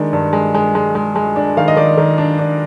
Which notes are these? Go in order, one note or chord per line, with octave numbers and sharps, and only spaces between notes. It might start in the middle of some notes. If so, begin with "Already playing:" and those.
Already playing: D#3 G#3 D4
G2
G#3
G#3
G#3
G#3
G#3
D4
D#3 F5
D#5
D#3 D5
D#3
D4
D4